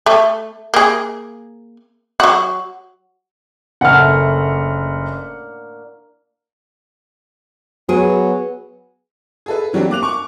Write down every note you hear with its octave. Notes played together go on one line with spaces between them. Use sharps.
A3
A#3 G#4
F#3 F#4
F#1 A2 D3 A#3 F#5 F6
F#3 B3 G#4
G#4 A4 B4
E3 F#3 G3 C4 D4
A#3 D6 F#6 F7
C#6 D6